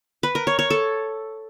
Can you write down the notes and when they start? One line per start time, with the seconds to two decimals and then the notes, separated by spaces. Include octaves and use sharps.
0.23 B4
0.35 A#4
0.47 C#5
0.59 C#5
0.70 A4